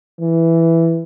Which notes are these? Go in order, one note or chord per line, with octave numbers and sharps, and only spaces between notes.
E3